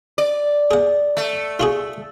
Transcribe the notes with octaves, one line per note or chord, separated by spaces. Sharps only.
D5
G#4 F#5
A3
F4 F#4 G#4